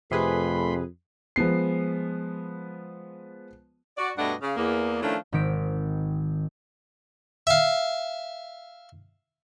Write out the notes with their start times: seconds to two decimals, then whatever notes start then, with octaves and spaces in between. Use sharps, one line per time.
0.11 F2 C3 A3 G#4 B4 B5 C6
1.36 F3 G#3 B3 C7
3.97 F#4 D5
4.17 G2 B2 A3 D4 D#5 F#5
4.41 C#3 F5
4.57 E2 A#3
5.02 D#3 F3 A3 C#4 D4 E4
5.32 G#1 D#3 C4 D#4 B6 D7
7.47 E5 F5